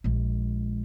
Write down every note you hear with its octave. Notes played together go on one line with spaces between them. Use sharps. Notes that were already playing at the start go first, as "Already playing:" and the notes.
A#1 G#3